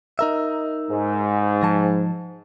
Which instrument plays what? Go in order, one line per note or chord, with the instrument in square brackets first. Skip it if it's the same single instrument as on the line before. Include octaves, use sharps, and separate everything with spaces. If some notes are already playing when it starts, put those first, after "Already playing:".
[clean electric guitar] D#4 A#4 E5
[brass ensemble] G#2
[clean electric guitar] F3 A5